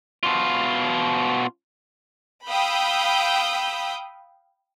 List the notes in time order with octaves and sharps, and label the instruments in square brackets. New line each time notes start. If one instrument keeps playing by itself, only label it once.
[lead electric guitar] B2 F4
[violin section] F5 G5 B5 D#6 E6 G6